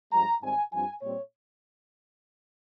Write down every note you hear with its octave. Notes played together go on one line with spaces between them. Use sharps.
G2 F3 G#3 A#5
G#1 G#2 G3 C4 G#5
G2 F3 C4 F4 G#5
A#2 G3 C4 C#5